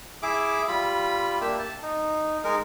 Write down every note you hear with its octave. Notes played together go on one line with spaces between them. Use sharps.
E4 G#4 E5 D6
G3 F4 B5
A#3 D4 G4 E5
A5
D#4
G#3 D#4 A#4